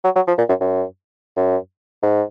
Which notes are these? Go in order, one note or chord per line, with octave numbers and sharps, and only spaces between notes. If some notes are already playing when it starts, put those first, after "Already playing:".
F#3
F#3
F3
A#2
F#2
F#2
F#2
G#2